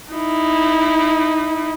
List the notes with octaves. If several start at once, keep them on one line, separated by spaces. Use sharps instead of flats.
D#4 E4